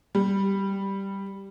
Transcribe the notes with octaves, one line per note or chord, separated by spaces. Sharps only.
G3